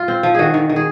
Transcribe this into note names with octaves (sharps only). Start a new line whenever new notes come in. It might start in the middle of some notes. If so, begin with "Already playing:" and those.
Already playing: F4
C4
F3
D#3 F#4 G#4
D#3
D#3
G#4